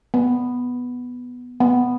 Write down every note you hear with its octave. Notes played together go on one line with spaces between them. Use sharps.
B3
B3